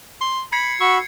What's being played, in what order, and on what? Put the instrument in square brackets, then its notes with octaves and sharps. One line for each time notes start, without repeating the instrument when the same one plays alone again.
[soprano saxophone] C6
[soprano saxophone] B5 [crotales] G#6 C7 C#7
[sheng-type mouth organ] F#4 B5 E6 [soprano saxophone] C#6